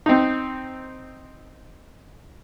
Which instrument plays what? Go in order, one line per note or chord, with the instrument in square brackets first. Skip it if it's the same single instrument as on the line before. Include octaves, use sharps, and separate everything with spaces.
[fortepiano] C4 D#4